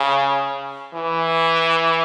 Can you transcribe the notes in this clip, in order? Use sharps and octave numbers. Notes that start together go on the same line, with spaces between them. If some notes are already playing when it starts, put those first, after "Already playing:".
Already playing: C#3
E3